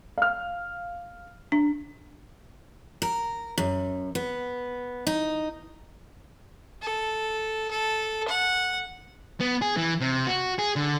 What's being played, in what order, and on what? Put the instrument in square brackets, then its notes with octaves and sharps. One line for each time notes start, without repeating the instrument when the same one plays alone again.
[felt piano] F5 F6
[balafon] D4
[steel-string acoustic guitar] A#4
F#2
B3
D#4
[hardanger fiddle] A4
A4
F#5
[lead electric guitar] B3
G#4
E3
C3
F#4
G#4
D3